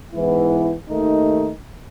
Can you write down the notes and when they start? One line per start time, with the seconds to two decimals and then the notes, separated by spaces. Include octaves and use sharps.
0.12 G#2 E3 B3 E4
0.90 D#2 D#3 A3 D#4